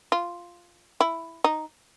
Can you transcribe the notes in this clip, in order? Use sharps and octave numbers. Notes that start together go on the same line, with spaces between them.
F4
E4
D#4